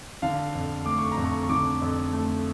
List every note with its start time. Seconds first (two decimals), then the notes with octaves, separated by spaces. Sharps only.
0.22 D3 F5
0.55 F2
0.86 A3 D6
0.99 C#6
1.12 A#5
1.17 F2
1.24 C#6
1.43 C#6
1.49 D3 D6
1.82 F2
2.13 A3